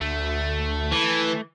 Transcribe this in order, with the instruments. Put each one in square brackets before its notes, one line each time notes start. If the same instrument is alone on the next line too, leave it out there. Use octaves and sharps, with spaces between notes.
[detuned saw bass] D2 [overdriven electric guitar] A3
[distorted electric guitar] E3